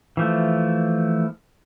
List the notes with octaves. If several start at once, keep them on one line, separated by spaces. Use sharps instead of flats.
E3 F3 A3